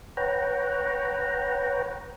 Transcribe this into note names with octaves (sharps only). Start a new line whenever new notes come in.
B4 C#5 F#5 G5 A#5